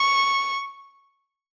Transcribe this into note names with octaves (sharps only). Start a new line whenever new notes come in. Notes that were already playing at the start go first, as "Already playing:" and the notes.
Already playing: C#6